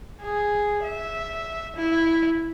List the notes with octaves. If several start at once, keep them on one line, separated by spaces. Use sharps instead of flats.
G#4
E5
E4